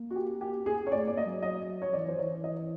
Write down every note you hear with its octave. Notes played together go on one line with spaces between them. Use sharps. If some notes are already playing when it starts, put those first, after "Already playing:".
Already playing: A#3
F#4
G4
G4
G#4
C#5
A3 D5
A#3 D5
D#5
F#3
D#5
C#5
E3 D5
C5
E3 C#5
D#5